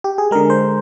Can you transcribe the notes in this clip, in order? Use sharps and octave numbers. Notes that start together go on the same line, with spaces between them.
G4
G#4
D3 G#3 A#4
C5